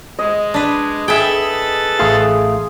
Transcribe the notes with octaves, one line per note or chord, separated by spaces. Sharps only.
G#3 D#5
D4 B4
G#4 A4 B4 E5 G5 A6
A1 A3 G#4 F5 C6 D#6